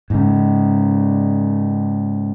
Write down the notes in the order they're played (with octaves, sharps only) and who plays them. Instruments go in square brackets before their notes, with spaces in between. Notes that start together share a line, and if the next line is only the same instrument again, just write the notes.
[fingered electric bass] G#2 C#3